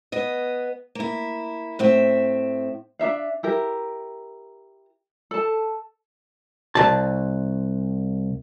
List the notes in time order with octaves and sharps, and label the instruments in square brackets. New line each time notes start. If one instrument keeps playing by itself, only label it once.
[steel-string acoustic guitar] B3 D#5
A#3 E4
A2 C4 E5
[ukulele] D4 D#4 E5 F5
E4 G4 A#4
A4 A5
[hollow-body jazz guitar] C2 A5